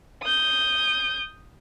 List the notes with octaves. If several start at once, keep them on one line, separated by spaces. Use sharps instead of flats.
D#6 G6